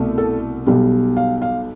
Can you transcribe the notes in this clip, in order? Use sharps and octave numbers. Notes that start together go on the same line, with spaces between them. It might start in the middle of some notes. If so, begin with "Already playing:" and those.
Already playing: C2 B2 A3
A4
B1 B2 G3
F5
F5